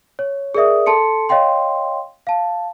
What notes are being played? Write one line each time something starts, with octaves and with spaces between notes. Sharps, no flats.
C#5
G#4 A#4 D5 E5 D#6
A4 A5 C6 C#7
C#5 D#5 F5 G5 C6
F5 A5